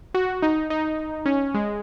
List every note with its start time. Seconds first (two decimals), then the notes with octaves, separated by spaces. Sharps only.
0.14 F#4
0.42 D#4
0.70 D#4
1.26 C#4
1.54 G#3